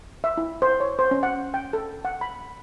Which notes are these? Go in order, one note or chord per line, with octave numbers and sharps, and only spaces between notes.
E5
E4
C5
C#5
C5
C#4
F#5
G5
A4
F#5
B5